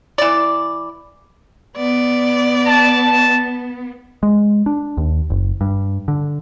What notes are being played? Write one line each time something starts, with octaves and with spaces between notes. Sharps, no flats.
E3 D5
B3 D5
A5
G#3
D4
D#2
F#1
G2
D3